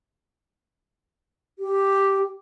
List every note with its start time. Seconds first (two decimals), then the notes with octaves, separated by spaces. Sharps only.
1.59 G4